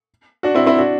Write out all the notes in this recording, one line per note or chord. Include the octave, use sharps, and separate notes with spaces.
D4 F#4
C4 E4
C4 E4
D4 F#4